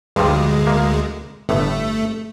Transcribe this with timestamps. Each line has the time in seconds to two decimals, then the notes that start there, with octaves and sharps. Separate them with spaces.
0.16 D2 G2 F3 G3 G#3
0.67 A#3
1.49 G1 A2 A3